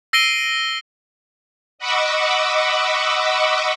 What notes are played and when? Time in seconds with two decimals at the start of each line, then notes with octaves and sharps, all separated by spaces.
0.13 E6 A#6 C7 D7 D#7 G7
1.79 D#5 F#5 B5 C#6 D6 E6